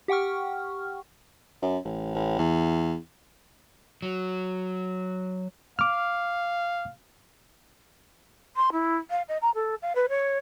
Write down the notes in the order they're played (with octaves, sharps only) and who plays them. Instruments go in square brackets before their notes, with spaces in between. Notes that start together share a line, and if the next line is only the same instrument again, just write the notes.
[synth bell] G4 F#5 G5 C#6 F6
[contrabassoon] F#2
A1
A1
E2
[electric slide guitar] F#3
[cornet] F5 [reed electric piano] D6 F6
[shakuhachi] C6
E4
F5
D#5
A#5
A4
F5
B4
C#5